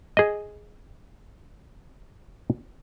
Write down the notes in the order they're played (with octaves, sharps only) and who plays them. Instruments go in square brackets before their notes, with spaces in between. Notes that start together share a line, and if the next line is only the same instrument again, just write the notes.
[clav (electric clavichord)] G#4 D#5